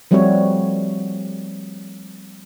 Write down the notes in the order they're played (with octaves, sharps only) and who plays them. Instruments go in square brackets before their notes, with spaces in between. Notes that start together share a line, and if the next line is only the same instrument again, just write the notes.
[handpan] F3 G3 A3 C4 F#4 C#5